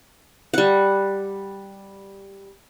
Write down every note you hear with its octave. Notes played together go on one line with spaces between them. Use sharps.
G3 F#5